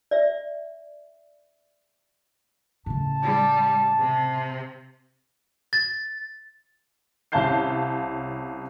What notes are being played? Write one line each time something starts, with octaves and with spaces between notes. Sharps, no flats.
D5 E5
A2 C#3 A5
G3
C3
A6
C2 C#4 F5 A5 G6 C7